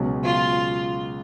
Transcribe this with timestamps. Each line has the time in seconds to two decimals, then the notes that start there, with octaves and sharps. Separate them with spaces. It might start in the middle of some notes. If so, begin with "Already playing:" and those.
Already playing: C#2 B2 F#3 C#4
0.26 F4